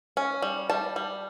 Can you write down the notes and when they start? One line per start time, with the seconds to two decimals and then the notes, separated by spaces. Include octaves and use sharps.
0.17 C#4
0.42 G3
0.70 G3 A5
0.96 G3